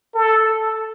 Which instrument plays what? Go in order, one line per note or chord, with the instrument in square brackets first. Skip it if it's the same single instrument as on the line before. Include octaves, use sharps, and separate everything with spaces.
[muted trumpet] A4